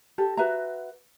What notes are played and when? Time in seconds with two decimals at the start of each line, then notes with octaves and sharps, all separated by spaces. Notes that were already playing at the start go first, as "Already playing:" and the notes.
0.18 G4 A4
0.37 F#4 B4 E5 A#5